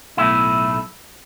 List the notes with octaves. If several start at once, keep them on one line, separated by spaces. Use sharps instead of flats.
B1 A2 A3 E4